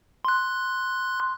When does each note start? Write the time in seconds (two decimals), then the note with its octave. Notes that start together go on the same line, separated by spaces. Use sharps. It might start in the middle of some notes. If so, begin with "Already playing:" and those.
0.25 C6 F#6